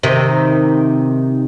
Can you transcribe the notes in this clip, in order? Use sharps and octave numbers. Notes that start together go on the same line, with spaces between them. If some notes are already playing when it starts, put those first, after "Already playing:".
C3 D#3